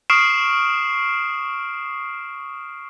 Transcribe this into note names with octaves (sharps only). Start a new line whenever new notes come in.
C#6 D#6 F6 C7 D7 E7